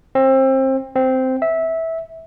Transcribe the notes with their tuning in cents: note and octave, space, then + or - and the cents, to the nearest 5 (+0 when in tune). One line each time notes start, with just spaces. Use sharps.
C4 +25
C4 -10
E5 -15